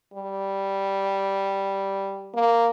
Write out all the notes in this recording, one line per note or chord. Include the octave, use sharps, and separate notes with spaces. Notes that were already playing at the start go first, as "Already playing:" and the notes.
G3
A#3